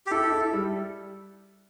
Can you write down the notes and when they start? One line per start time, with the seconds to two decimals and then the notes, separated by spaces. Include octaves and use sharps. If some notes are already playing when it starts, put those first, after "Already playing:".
0.07 G4
0.11 E4 A4
0.32 E4
0.53 G3